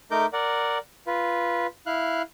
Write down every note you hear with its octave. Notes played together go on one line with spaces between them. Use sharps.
A3 D#4 A#4 D6 G6
A#4 D5 F#5
F4 B4
E4 F5 F#6